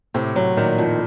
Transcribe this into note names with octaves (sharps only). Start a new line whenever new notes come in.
A2 C3
F#3
A#2 D#3
F2